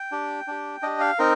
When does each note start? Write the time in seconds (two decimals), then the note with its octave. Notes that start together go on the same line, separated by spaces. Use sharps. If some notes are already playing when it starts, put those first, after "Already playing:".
Already playing: G5
0.12 D4 G4
0.48 D4 G4
0.82 D4 G4 D#5
1.00 F5
1.19 C4 D#4 A#4